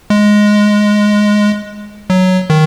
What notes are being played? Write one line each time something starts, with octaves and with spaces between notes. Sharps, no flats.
G#3
F#3
D#3